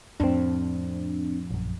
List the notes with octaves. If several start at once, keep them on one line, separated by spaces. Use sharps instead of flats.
F2 A2 C4 D4
A#1 F#2